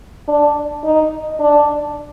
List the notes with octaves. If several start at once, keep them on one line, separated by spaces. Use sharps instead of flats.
D4
D#4
D4